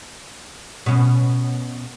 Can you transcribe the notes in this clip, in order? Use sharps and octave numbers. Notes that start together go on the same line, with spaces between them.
B2 C#4